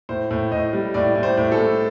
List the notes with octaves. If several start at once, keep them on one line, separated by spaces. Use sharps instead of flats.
A2 C5
A2
A2 D#5
G3
A2 D5
A2
C5
A2
A4
A2